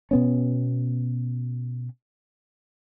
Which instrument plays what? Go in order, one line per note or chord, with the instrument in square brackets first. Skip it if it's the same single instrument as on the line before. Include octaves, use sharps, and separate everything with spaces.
[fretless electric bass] B2 B3 C#4